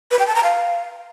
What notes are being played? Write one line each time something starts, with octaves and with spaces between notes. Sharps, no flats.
B4
G5
A5
A#5
F5